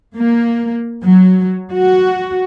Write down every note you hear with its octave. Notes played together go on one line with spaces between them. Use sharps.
A#3
F#3
F#4